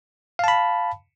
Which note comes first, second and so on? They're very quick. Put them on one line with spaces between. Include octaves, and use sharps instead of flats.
F5 A5 B5